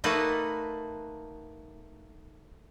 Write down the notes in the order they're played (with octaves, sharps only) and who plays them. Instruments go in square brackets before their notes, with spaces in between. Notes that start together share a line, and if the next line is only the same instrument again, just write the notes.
[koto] A3 A#3 D#4 F#4 B4